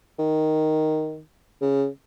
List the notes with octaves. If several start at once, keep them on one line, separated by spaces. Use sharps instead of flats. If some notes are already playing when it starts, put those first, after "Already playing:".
D#3
C#3